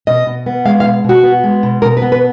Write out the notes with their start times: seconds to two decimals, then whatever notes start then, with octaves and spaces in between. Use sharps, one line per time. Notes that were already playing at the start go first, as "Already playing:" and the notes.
0.07 B2 D#5
0.27 B2
0.46 B3
0.65 G#3 F5
0.80 F5
0.84 B2
1.04 B2
1.09 F#4
1.24 B3
1.44 G#3
1.63 B2
1.82 B2 A#4
1.97 B4
2.02 B3
2.12 B4